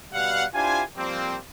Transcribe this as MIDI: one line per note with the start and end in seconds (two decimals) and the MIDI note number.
0.13 0.45 47
0.13 0.45 55
0.13 0.45 77
0.13 0.45 78
0.54 0.82 62
0.54 0.82 64
0.54 0.82 65
0.54 0.82 67
0.54 0.82 72
0.54 0.82 80
0.97 1.36 53
0.97 1.36 55
0.97 1.36 58
0.97 1.36 60